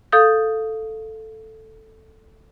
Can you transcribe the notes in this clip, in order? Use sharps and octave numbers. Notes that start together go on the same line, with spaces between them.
A4 F5 D#6 G6